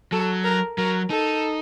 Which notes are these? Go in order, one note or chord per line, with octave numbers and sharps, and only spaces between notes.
F#3 A4
A#4
F#3 A#4
D#4 A4